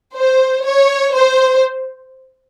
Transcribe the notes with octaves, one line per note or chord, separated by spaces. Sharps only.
C5
C#5
C5